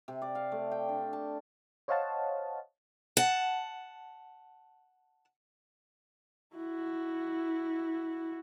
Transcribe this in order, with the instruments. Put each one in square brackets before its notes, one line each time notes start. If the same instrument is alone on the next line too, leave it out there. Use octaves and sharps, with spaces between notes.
[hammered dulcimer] C3
D5
F5
A3
G5
D4
A5
[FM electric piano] C5 C#5 D#5 F5 F#5 A5
[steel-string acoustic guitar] F#5 A5
[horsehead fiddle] E4 F#4